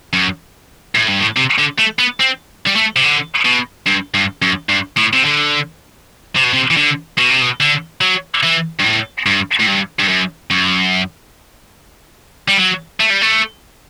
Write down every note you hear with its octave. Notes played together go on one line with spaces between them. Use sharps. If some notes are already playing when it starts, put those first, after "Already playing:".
F#2
A2
G2
A2
C3
D3
A3
B3
C4
G3
A3
C3
D3
B2
G2
G2
F#2
G2
A2
C3
D3
C3
B2
C3
E3
D3
B2
C3
B2
D3
F#3
E3
G2
A2
G2
A2
G2
G2
F#2
F#2
G3
F#3
A3
G3
A3